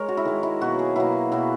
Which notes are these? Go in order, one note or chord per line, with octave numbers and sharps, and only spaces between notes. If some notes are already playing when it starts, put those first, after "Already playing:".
Already playing: G#3 A#4 C#5
F#4
E4
D#3 G#3
E4
B2 F#3 A#3 F#4
G#4
B2 F#3 A#3 E4
B2 F#3 A#3 E4